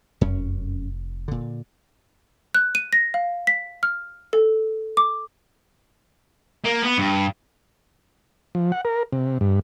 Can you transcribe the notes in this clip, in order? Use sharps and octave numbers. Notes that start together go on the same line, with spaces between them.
F1 F#2 C#4
A#2 D3
F#6
D#7
A#6
F5
B6
F6
A4
D6
A#3
B3
G2
F3
F#5
A#4
C3
G2